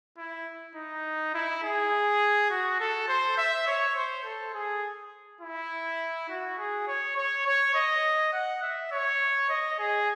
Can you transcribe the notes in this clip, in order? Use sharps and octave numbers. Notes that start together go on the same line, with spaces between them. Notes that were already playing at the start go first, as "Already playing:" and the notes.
E4
D#4
E4
G#4
F#4
A4
C5
E5
C#5
C5
A4
G#4
E4
F#4
G#4
C#5
C#5
C#5
D#5
F#5
E5
C#5
D#5
G#4